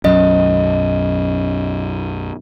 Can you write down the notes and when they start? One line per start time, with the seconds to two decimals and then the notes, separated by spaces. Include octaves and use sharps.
0.04 B1 F#2 F#3 C#4 D#5